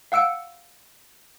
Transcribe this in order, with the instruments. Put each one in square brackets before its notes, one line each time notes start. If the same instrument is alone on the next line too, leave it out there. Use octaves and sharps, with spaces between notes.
[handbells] F5 F#5 E6 C#7 D7